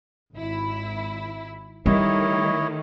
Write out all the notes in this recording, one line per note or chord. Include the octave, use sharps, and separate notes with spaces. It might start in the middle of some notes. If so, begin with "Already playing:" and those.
G#1 E4
D#3 G3 A3 E4 C#5 D#5